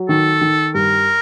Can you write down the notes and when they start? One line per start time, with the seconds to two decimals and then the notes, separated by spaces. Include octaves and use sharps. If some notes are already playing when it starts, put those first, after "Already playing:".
Already playing: F#3
0.09 D#3 A4
0.41 D#3
0.74 G2 A#4